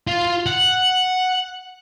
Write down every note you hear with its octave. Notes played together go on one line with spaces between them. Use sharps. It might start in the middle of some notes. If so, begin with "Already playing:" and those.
F4
F#5